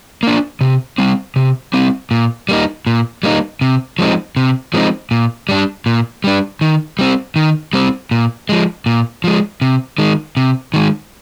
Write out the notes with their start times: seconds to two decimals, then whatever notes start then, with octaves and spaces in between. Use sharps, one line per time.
0.23 A#3 D4
0.61 C3
0.98 G3 C4
1.36 C3
1.74 G3 C4
2.11 A#2
2.49 G3 A#3 D#4
2.87 A#2
3.23 G3 A#3 D#4
3.61 C3
3.99 F3 G#3 C4 D#4
4.37 C3
4.74 F3 G#3 C4 D#4
5.11 A#2
5.49 G3 D4
5.86 A#2
6.24 G3 D4
6.61 D#3
6.99 G3 C4
7.36 D#3
7.73 G3 C4
8.11 A#2
8.49 F3 G#3
8.86 A#2
9.24 F3 G#3
9.62 C3
9.98 D#3 G#3
10.37 C3
10.74 D#3 G#3